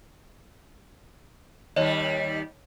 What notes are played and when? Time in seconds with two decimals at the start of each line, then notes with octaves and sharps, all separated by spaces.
1.76 D#2 G3 C#5 D#5